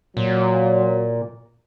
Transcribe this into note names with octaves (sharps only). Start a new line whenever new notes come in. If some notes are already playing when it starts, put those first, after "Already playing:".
A#2 F#3